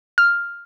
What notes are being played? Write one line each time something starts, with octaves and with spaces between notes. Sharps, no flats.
F6